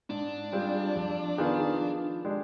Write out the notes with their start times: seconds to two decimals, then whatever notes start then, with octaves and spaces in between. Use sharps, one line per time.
0.09 G#2 D4
0.52 G3 C4 F4 G#4
0.96 F2
1.38 D#3 B3 F4 G#4
1.81 F3
2.24 G#3 D4 G4